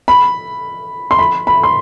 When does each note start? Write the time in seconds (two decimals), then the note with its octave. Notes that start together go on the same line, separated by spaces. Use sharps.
0.08 B5
1.11 C6
1.19 B5
1.47 B5
1.63 C6